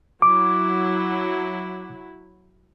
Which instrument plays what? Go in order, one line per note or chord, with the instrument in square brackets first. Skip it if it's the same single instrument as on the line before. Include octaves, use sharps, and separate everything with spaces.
[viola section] F#3 E4 [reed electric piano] D6